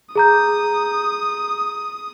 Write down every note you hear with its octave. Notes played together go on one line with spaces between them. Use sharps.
G#4 A#5 D#6 G6